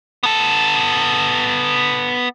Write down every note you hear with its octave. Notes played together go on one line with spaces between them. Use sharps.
B3 A4